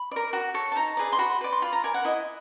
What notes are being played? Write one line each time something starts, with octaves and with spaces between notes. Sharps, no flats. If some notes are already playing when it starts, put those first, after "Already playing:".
Already playing: B5
A#4 D5
F#4
A4 C#5
A5
D#4 A#5
G#4 B4 D5
C6
F#4 B5
B4 D5
C6
F4 B5
A#5
A#4 D5 G#5
F#5
E4 D#5